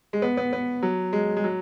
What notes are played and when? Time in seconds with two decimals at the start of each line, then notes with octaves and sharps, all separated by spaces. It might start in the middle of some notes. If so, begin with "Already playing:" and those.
0.13 G#3
0.22 B3
0.37 B3
0.53 B3
0.82 F#3
1.13 G#3
1.37 G#3
1.44 F#3